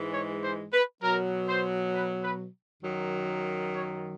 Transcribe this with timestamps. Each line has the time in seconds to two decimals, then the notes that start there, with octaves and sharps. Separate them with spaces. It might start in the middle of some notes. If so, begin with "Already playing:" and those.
Already playing: G#2 E3 G#3
0.13 C#5
0.44 C5
0.73 B4
1.03 B2 F#3 A#4
1.48 C5
1.93 B4
2.23 B4
2.83 F#2 D#3 F#3
3.73 C#5